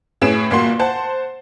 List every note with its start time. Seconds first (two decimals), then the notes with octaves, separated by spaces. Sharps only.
0.21 A2 C#4 G#4 B4 D7 E7
0.50 G1 A#2 A#3 F#4 C6
0.79 C5 F#5 A5